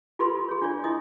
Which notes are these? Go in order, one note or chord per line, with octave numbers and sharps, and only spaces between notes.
F4 G4 A4 B4 B5 C6
G#4 C#5
D4 F4 G#4 C#5 D5
E4 D#5 D#6